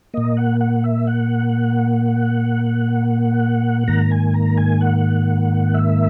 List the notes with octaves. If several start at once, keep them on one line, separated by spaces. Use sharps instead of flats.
A#2 A#3 D#5
F#5
F#5
E5
F#5
G#2 D#3 A#3 A#5
G#5
A#5
G#5
F#5
E5